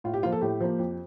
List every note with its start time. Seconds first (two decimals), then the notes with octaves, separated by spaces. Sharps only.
0.04 A2 F4
0.14 G4
0.23 F3 A#3 F4
0.32 A4
0.41 A2 G4
0.61 F3 A#3
0.79 F2